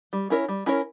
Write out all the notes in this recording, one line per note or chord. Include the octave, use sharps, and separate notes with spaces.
G3
C#4 E4 A#4 C#5
G3
C#4 E4 A#4 C#5